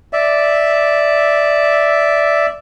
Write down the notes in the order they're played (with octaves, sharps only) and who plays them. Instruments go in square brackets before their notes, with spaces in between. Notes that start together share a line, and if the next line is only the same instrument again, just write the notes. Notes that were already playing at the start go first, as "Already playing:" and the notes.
[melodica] D5 E5